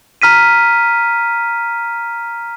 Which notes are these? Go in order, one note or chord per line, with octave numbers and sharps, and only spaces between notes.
A#5 F6 B6 D#7